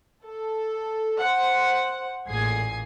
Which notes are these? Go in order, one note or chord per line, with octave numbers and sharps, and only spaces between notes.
A4
C5 F#5
A1 A#2 G#4 D#6 G#6 C7